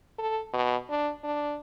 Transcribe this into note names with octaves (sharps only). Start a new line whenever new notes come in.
A4
B2
D4
D4